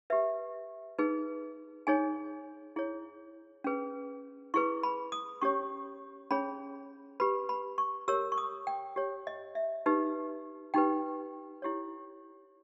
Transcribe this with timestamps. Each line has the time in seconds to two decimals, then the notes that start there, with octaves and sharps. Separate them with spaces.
0.10 G4 B4 E5
0.99 D#4 G#4 B4
1.87 D#4 G#4 C#5 G#5
2.76 E4 G#4 C#5
3.64 C#4 G#4 B4
4.54 E4 G#4 B4 C#6
4.83 B5
5.12 D#6
5.41 C#4 G4 C#5 C#6
6.31 C#4 G#4 C#5 B5
7.20 G4 B4 B5
7.49 B5
7.78 C#6
8.08 G4 A#4 C#5 E6
8.32 C#6
8.38 D#6
8.67 G5
8.96 G4 C#5
9.27 D#5
9.55 E5
9.86 D#4 G4 B4
10.74 D#4 G4 B4 G5
11.62 E4 G4 C#5